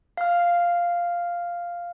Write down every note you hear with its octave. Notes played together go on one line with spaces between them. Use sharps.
F5 F6